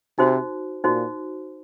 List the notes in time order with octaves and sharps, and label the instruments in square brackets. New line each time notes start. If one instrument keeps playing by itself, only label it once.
[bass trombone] C3 [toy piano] D#4 F#4 C5
[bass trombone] A#2 [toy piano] D#4 F#4 C5